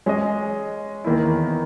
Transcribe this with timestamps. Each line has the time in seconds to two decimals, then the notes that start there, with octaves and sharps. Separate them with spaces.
0.06 G#3 C#4 G#4 D#5
1.04 E2 D#3 A#3 E4